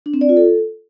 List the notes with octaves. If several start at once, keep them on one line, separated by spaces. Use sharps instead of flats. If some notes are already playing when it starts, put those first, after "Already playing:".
D4
C4
D5
F4
A4